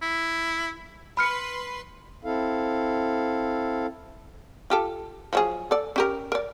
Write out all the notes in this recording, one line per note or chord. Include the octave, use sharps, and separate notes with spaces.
E4
B4 B5 C6 F6 C#7
C4 E4 A4 F5
F4 G4 A4
F3 F#3 G#4
A4 D5
C#4 G4 A#4
A#4 D5